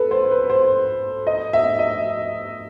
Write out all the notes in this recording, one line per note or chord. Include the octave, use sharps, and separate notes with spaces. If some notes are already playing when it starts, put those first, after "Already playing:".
Already playing: A4 B4
C5
B4
C5
D#5
E5
D#5